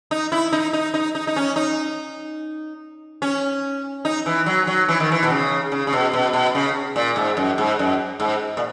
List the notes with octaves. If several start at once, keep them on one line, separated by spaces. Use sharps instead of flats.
D#4
E4
D#4
D#4
D#4
D#4
D#4
C#4
D#4
C#4
D#4
E3
F#3
F#3
E3
D#3
E3
B2
C#3
C#3
C#3
B2
B2
B2
C#3
A#2
G#2
F#2
G#2
F#2
G#2
A#2